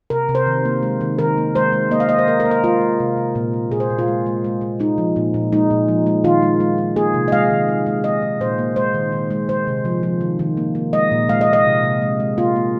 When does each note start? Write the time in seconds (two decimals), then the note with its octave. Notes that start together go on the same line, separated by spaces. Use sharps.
0.10 C3 A#4
0.29 C3
0.35 C5
0.47 D#3
0.65 A#3
0.83 G#3
1.01 D#3
1.19 D#3 A#4
1.38 A#3
1.55 G#3 C5
1.73 G#3
1.91 A#3 D#5
2.00 F5
2.09 A#3 D#5
2.19 C5
2.27 A#3 A#4
2.40 A#4
2.45 A#3
2.51 A#4
2.64 G#3 F4
2.81 G#3
3.00 C3
3.17 C3
3.35 A#2
3.53 G#3
3.72 A#2 G#4
3.80 C5
3.90 A#2
3.99 F4
4.08 G#3
4.26 G#3
4.44 G#3
4.61 G#3
4.80 G#3 D#4
4.98 F3
5.16 A#2
5.34 A#2
5.52 G#3 D#4
5.70 A#2
5.88 F3
6.06 G#3
6.24 D#3 F4
6.42 G#3
6.60 G#3
6.78 G#3
6.96 A#3 G#4
7.14 C3
7.28 D#5
7.32 G#3 F5
7.50 D#3
7.68 G#3
7.86 G#3
8.04 G#3 D#5
8.22 G#3
8.41 A#2 C5
8.58 A#3
8.76 G#3 C5
8.95 D#3
9.12 D#3
9.31 G#3
9.49 G#3 C5
9.67 C3
9.85 F3
10.03 F3
10.21 D#3
10.39 D#3
10.57 A#3
10.75 A#3
10.93 G#3 D#5
11.12 A#2
11.29 G#3 F5
11.41 D#5
11.47 G#3
11.53 D#5
11.65 C3
11.84 C3
12.02 G#3
12.20 G#3
12.38 A#3 F4
12.56 A#3